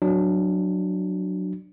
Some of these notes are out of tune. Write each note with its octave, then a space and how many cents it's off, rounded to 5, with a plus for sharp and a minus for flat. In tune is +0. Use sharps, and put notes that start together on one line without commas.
F#3 +0 D4 +15